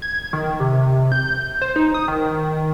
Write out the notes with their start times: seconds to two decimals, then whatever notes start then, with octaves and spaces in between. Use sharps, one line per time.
0.02 G#6
0.33 D#3
0.60 C3
1.12 G6
1.62 C5
1.76 D#4
1.94 D#6
2.08 D#3